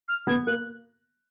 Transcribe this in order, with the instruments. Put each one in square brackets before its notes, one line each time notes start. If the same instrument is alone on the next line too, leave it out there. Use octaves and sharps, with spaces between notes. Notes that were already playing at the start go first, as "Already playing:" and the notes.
[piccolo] F6
[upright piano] B3 [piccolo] G#6
[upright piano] A#3 [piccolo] F#6